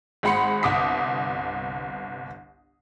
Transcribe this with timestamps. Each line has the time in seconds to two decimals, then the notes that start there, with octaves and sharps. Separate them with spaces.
0.23 G#1 G#3 F#5 B5 C6 C#7
0.63 G1 C2 D6 D#6 B6